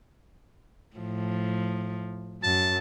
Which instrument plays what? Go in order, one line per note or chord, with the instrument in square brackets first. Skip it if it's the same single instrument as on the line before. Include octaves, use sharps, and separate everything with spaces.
[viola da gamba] A2 F3
[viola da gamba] F#2 [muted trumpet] A5